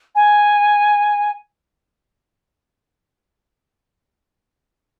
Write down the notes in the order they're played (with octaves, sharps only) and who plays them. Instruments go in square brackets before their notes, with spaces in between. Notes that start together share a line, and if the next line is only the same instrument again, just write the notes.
[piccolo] G#5